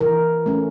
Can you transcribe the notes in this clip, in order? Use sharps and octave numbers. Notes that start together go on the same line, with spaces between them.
E3 A#4
A3 C#4